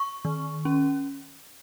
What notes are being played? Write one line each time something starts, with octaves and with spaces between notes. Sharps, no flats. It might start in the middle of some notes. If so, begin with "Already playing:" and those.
Already playing: C#6
D#3
C#4